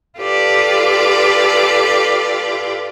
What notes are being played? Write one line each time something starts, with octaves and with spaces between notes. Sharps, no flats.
F4 G4 A4 B4 D5